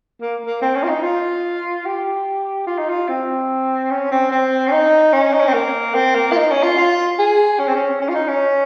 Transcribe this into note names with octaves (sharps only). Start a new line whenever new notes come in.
A#3
A#3
C4
C#4
F4
D#4
F4
G4
F4
D#4
F4
C4
C#4
C4
C4
C#4
D#4
C#4
D#4
C#4
C4
A#3
C4
A#3
F4
D#4
C#4
F4
F4
G#4
C#4
C4
C#4
C#4
F4
D#4
C#4